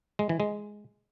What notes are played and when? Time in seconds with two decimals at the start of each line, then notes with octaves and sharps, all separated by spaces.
0.19 G#3
0.29 E3
0.40 G#3